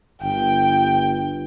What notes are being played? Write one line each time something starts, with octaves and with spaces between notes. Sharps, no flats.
G1 G5